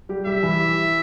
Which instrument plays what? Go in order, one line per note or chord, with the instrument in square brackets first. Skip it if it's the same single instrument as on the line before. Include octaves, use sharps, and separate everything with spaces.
[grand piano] G3 G4
[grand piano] G3 G4 [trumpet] E5
[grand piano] E3 E4